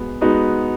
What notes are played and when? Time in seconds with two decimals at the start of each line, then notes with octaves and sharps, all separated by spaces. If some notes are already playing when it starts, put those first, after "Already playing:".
Already playing: G#3 B3 F#4
0.21 G#3 B3 D#4 F#4